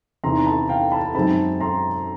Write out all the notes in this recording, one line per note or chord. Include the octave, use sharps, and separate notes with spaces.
E2 C3 D#3 A#5 C6
A5 B5
F5 G5
A5 B5
F#2 D#3 G#3 C4 D#4 A5 B5
A#5 C6